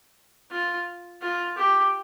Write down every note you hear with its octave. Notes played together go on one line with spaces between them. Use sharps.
F4
F4
G4